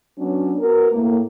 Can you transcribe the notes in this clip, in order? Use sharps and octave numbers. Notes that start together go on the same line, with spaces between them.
F#3 B3 C#4 D4
B3 F#4 A#4
A2 A#3